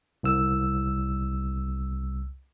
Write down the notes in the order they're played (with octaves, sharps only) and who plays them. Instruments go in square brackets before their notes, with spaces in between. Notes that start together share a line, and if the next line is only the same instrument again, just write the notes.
[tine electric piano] C2 E6